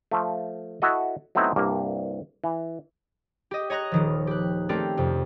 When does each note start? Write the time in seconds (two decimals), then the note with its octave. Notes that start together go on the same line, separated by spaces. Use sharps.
0.11 F3 A3
0.82 E4 F#4 A4 D#5
1.35 F#3 A3 B3 C4 D#4 E4
1.56 C2 G2 A#3
2.44 E3
3.51 G4 D#5
3.70 C#5 D#5 A#5 F#6 A#6
3.92 D#1 D#3 F3
4.27 G4 F#6
4.69 A3 C4 C#4 G4 A#4 D5
4.97 F2 C3